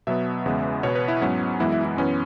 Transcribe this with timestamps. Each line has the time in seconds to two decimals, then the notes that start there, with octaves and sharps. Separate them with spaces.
0.07 B2 F#3 B3 E5
0.46 E2 C#3 G#3 B3
0.83 B2 B3 C#5
0.95 B4
1.08 E4
1.21 G#2 F#3 B3 C#4
1.60 F#2 E3 G#3 B3 E4
1.72 E4
1.85 E4
1.97 F#2 E3 B3 C#4